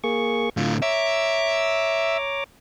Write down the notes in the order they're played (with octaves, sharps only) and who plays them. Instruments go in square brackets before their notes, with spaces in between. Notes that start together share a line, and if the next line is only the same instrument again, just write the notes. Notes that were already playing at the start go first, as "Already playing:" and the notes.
[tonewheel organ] A#3 G#4 C#6
[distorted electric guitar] A2 D3 [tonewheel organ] F4
[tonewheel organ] C#5 A#5 D6 [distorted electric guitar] E5